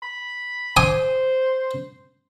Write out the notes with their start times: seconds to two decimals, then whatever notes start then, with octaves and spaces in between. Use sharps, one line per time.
0.03 B5
0.77 C5 G#5 D6 D#6